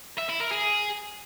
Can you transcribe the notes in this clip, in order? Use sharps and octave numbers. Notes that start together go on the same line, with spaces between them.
E5
E4
A#4
G#4